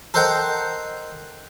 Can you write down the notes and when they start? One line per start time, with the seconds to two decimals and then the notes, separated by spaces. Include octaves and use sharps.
0.14 A4 A#4 C5 D#5 F#5 G5